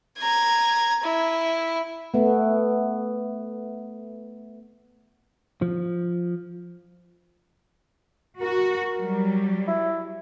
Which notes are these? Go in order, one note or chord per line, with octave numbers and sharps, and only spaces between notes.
A#5 G#6
E4
A3 B3
F3
F#4 A#4
F#3 G3
E4